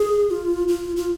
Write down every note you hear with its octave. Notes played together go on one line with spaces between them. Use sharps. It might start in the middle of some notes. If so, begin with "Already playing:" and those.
Already playing: G#4
F4
F4
F4